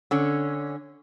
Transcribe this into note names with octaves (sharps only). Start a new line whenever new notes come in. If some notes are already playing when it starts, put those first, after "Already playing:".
D3 C#4